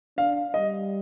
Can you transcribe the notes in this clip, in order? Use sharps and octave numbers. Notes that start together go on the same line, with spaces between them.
D4 F5
G3 D#5